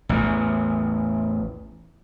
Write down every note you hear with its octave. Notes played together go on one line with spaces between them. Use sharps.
A1 E2